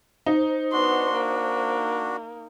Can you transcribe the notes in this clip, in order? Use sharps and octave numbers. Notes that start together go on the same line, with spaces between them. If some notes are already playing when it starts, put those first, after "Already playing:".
D#4 C5
B3 D4 F#4 C6
A#3